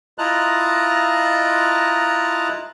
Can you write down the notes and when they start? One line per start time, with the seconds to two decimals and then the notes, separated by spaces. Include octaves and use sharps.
0.18 E4 F4 D#5 A5 A#5 F#6